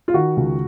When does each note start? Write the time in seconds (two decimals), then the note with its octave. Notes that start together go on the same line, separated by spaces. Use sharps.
0.08 F4
0.14 D#3 F#4
0.37 C#2